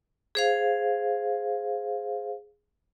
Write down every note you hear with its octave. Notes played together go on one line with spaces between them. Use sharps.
G#4 C5 F5